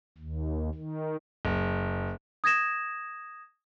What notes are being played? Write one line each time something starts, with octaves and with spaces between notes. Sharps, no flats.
D#2
D#3
F#1
D#6 G#6 A#6 E7